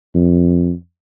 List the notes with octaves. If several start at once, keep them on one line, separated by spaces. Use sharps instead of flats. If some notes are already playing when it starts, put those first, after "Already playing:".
F2